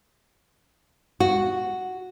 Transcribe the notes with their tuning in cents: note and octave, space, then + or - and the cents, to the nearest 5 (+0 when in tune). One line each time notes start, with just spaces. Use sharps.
F#4 +0